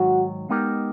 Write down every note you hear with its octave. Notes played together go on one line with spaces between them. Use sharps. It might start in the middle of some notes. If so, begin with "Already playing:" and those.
Already playing: G#2 D#3 F#3 F#4
G#3 B3 D#4 G4 A#4